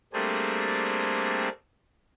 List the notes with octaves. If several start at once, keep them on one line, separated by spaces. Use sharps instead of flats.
G3 A3 A#3 C4 D4 G#4